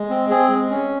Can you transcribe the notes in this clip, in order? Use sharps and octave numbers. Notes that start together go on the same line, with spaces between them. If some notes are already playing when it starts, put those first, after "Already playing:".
Already playing: G#3
C4
C4 G#4
G#3
C#4